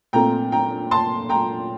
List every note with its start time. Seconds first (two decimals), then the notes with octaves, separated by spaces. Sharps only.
0.13 A#2 A3 C4 F4 G5 A#5
0.52 G5 A#5
0.91 A5 C6
1.29 G5 A#5